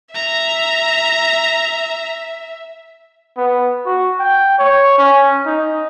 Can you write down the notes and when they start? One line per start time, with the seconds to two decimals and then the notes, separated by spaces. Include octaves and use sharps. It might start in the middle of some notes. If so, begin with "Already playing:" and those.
0.15 E5 A#5
3.37 B3
3.86 F#4
4.19 G5
4.59 C#5
4.98 C#4
5.46 D#4